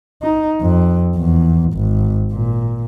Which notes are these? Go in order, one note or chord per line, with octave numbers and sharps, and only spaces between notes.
D#4
F2
E2
G#1
A#2